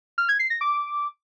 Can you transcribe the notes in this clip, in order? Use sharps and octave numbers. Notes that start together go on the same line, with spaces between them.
F6
G#6
C7
A#6
D6